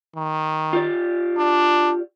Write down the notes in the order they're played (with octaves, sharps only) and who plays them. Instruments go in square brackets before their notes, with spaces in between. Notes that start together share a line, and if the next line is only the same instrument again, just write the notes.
[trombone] D#3
[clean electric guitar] F4 G4 D5
[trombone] D4